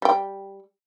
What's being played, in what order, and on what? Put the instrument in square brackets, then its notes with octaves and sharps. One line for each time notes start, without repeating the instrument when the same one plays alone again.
[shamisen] G3 G5